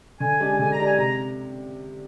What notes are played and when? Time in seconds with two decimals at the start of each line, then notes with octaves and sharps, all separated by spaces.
0.20 D3 G#5
0.40 G#3 D4 G4 D5
0.59 D3 G#5
0.73 A#5
0.79 G#3 D4 G4 D5
0.86 G#5
0.98 C3 A#5